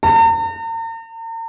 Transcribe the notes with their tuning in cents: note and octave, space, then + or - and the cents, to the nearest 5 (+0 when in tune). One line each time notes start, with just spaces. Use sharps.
A#5 -45